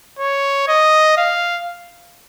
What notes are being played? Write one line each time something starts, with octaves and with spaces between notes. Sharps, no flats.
C#5
D#5
F5